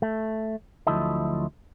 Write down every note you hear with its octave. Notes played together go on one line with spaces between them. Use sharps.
A3
D2 F3 F#3 E4 A4 D#5